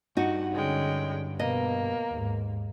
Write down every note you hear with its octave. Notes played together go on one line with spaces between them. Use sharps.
G2 D#4 F#4 F#5
D3 G#3 C#4 G5
B2 A#3 D#5
D#2 G#2